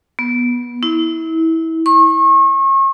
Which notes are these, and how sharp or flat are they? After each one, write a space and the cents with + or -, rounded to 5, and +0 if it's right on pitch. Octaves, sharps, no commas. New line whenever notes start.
B3 -20
E4 -25
C#6 -35